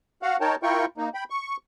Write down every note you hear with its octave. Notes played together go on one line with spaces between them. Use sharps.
F#4 F5 F#5
D#4 A#4 C#5 G5 A5
E4 F4 A#4 G5 C#6
A#3 D#4
G5 B5
C#6